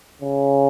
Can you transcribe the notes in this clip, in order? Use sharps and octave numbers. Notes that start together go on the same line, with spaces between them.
C#3